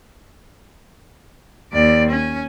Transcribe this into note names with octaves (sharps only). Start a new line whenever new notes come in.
D#2 D5
C#4